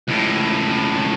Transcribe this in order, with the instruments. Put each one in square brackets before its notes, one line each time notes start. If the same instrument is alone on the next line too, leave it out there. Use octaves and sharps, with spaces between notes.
[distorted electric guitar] C#2 A2